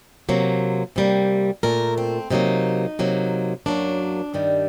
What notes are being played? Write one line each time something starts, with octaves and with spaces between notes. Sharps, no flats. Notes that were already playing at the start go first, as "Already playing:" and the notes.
C3 F#3 A#3
C3 G3 A#3
A#2 A3 A#4
C4
C3 F#3 A#3 D#4
C3 F#3 A#3
F#2 F#3 A#3 D4
G2 D#3 G3